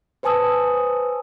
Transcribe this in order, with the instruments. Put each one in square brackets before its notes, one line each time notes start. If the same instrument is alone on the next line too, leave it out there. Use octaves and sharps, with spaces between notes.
[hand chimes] B4 C5 G#5 A5 D#6 E6